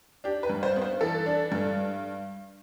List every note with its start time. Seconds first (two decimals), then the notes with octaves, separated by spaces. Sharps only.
0.24 D4 G4
0.43 B4
0.50 G2
0.63 C5
0.76 B3
0.82 C5
1.01 E3 A4
1.26 D4
1.52 G2